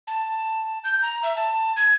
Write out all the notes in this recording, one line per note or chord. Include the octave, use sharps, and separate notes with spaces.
A5
G6
A#5
E5
A5
G#6